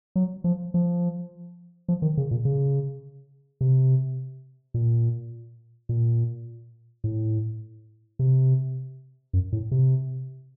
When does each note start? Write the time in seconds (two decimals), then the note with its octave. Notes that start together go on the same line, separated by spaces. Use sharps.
0.16 F#3
0.44 F3
0.74 F3
1.88 F3
2.02 D#3
2.17 C#3
2.31 A#2
2.45 C#3
3.61 C3
4.74 A#2
5.89 A#2
7.04 A2
8.19 C3
9.33 F#2
9.52 A2
9.71 C3